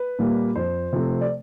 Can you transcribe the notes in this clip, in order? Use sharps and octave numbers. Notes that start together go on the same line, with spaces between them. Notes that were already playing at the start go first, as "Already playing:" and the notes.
Already playing: B4
A#2 G3 A#3
F2 C5
C3 F3 A3 C4
D5